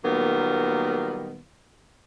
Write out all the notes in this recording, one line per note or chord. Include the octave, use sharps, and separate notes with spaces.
A#2 D#3 F#3 G3 A#3 B3